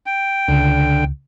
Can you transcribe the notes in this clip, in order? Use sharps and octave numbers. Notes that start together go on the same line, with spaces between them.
G5
C#2 D3